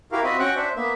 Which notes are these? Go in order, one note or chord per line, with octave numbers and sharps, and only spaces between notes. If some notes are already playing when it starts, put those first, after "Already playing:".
E4 F#4 G4 A#4 F5
C4 F4 F#4 D#5 E5 B5
C#4 F#4 F#5 G5 C#6 F#6
D4 C5 E5
A#3 B3 E5